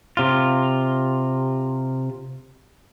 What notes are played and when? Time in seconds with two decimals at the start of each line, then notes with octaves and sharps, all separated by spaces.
0.17 C3 F4